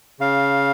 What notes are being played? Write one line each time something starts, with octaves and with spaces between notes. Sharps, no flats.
C#3 F5